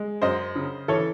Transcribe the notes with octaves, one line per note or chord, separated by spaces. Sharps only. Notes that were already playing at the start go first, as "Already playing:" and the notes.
Already playing: G#3
F#2 C5 D#5
C#3
E3 A4 C#5